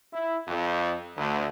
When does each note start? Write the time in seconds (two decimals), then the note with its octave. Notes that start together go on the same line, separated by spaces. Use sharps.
0.13 E4
0.48 F2
1.17 D2